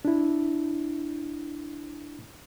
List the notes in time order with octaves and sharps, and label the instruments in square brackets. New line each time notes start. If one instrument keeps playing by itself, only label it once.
[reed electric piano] D4 E4